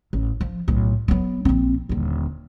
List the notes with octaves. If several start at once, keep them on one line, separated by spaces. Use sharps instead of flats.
A1
F3
B1 A2
F#3 B3
A#1 C4
D#1 D3